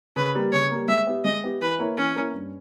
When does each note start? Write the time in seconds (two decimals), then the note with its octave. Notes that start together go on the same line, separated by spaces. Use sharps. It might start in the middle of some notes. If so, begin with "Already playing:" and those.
0.16 C#3 B4
0.35 G3 A#3
0.52 C#3 C#5
0.71 G3 A#3
0.88 G#3 E5
1.07 B3 G4
1.25 G#3 D#5
1.44 B3 G4
1.61 E3 B4
1.79 A#3 E4 A#4 C#5
1.97 E3 C#4
2.16 A#3 E4 A#4 C#5
2.34 G2